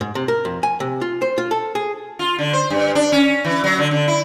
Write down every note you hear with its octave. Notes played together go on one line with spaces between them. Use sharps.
G#2
C3
A#4
F2
G#5
C3
F4
C5
F4
A4
G#4
F4
D3
C5
G2
D4
C#4
E3
F#3
D3
D3
E4